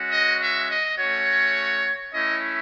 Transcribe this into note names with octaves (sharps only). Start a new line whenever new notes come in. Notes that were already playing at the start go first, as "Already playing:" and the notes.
Already playing: G#3 C#4 F#4
D#5
E5
D#5
A3 C#4 F#4 C#5
A3 C#4 E4 D#5